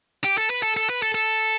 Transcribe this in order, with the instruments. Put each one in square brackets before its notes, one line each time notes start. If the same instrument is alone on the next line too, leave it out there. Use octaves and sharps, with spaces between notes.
[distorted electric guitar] G4
A4
B4
A4
A4
B4
A4
A4